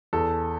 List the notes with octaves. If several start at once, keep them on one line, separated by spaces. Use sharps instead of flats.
E2 A4